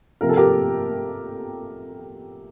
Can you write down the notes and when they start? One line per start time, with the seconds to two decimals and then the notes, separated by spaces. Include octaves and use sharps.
0.21 C3 F3 A#3 A#4
0.29 A4
0.36 G4 A#4